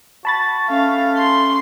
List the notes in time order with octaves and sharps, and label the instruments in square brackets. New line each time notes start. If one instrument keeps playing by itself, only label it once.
[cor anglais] F#4 [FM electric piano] A5 B5 A6
[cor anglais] A3 [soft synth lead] C#4 [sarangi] F5
[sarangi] C6